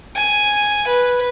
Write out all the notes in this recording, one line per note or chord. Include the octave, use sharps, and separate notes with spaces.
G#5
B4